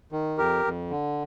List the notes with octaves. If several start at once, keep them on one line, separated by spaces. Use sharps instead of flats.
D#3
F2 G4 A#4
F2
D3